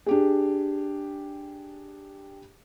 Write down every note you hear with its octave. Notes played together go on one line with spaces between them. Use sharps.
D4 G4 G#4